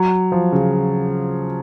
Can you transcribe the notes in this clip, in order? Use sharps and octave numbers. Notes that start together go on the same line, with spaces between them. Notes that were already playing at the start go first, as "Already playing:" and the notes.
Already playing: F#3
F3
C#3